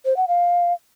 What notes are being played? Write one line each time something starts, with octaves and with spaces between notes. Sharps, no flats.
C5
F#5
F5